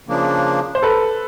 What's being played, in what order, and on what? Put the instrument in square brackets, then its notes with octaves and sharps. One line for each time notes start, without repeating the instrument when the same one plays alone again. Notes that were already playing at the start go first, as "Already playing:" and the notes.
[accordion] C#3 F3 A#3 D4
[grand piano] C5
A4 B4